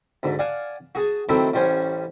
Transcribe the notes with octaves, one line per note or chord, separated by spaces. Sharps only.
D2 G#2
D5 F5 F#5 G#5 A5
F#4 G#4 A5
D#3 F#3 A3 C4 E4
A1 G3 C#4 C5 F#5 G#5